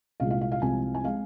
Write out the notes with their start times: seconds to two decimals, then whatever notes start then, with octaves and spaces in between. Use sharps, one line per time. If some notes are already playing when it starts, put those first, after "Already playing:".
0.20 C2 A#2 G#3 F5
0.30 F5
0.41 F5
0.52 F5
0.62 C2 C3 F3 G#3 C4 G#5
0.95 G#5
1.03 G#3 C4 F5